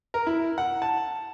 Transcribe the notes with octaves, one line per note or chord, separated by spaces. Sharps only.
A#4
E4
F#5
A5